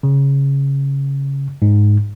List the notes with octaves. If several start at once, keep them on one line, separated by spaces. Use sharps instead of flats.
C#3
G#2